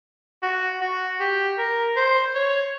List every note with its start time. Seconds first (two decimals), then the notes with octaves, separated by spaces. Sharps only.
0.43 F#4
0.81 F#4
1.20 G4
1.58 A#4
1.97 C5
2.35 C#5